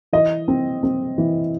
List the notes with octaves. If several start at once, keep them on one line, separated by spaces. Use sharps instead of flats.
E3 D#5
C4
C4
E3